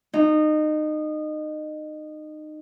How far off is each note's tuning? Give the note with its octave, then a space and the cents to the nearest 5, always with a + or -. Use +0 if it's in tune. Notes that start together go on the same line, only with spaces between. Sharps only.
D#4 -25